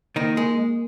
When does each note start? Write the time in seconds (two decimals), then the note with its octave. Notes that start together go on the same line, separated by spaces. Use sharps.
0.16 D#3 A#3 D#4
0.37 G#3